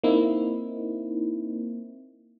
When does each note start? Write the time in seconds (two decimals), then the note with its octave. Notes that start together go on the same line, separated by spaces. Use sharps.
0.03 A#3 C4 D#4 E4